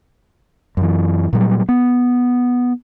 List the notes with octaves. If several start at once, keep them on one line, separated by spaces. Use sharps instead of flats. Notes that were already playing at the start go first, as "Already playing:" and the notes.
F#2 E3
A#2 F#3 G3
B3